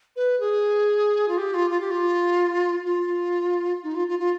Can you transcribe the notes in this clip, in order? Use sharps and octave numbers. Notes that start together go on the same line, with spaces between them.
B4
G#4
F4
G4
F4
F4
G4
F4
F4
D#4
F4
F4
F4